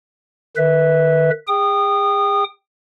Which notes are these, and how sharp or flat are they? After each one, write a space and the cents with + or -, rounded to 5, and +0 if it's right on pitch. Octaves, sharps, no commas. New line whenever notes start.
D#3 -40 B4 +0 E5 -15
G#4 -35 G5 +0 D#6 -25